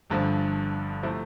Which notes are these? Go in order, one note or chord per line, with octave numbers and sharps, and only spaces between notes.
G1 G2 D3 F3
C3 F3 A3 E4